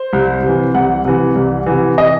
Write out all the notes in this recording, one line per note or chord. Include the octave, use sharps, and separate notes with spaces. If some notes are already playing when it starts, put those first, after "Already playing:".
Already playing: C5
C2
C3 E3
C2 F#5
C3 E3
C2
C3 E3
D#5